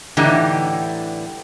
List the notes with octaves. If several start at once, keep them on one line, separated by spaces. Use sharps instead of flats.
A2 D3 E3 G3 D#4 G4